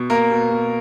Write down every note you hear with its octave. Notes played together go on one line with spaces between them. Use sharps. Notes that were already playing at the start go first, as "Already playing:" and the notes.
Already playing: B2
A#3 A#4
B2
B2